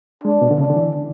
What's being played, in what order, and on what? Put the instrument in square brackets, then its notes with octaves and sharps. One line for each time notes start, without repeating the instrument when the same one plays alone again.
[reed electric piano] G#3 [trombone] D4
[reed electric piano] B2
D3
[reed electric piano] C#3 [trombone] D4
[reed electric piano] D3
E3